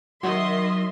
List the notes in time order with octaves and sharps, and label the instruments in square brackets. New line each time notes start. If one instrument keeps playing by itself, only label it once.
[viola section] D#3 E5 C6 [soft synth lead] F#3 [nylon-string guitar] F#4 [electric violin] D#5